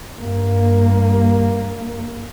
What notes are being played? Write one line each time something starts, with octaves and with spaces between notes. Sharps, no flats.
G2 A#3